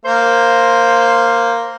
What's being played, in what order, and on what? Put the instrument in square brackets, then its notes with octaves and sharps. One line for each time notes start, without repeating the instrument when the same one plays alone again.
[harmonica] A#3 [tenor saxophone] C5